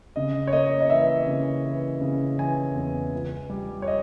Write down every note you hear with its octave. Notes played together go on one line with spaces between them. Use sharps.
C#3 D#5
C#5
A#3 D#5
D#5
E3 E5
C#3
E3
C#3
E3 G#5
E2
C#2
G3
C#5
D#5